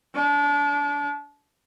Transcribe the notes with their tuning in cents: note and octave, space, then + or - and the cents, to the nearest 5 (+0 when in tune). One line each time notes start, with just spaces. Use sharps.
D4 -30